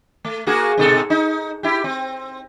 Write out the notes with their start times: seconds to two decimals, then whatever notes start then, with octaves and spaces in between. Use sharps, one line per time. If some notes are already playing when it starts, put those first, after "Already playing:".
0.25 A3
0.47 A#3 F#4 G#4
0.78 G#2 B2 A4
1.10 D#4
1.63 E4 G4
1.84 C4